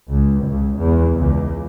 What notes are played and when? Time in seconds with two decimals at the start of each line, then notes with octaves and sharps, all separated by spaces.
0.10 C#2
0.45 C#2
0.80 E2
1.14 C#2